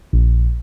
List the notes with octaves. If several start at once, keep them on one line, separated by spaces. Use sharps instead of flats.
A#1